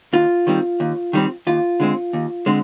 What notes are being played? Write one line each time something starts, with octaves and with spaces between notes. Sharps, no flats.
D#2 F4
D#3 G3 C4
D#2
D#3 G3 C4
D#2 F4
D3 G#3 C4
D#2
D3 G#3 C4